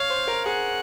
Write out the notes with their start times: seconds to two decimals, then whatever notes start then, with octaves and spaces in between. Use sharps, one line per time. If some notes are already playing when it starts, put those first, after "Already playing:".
Already playing: C#5 F5
0.10 C5
0.28 A#4
0.46 G#4 F#5